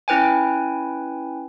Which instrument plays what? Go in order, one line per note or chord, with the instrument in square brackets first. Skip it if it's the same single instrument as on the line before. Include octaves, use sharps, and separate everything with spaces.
[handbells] C#4 E4 B4 G5 G#5